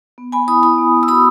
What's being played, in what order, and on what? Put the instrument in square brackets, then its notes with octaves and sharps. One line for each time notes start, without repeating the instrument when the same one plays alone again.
[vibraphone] B3
B3 G#5 B5
E4 B5 D#6
E4 B5 D#6
B3
B3
E6
F#4 B5 D#6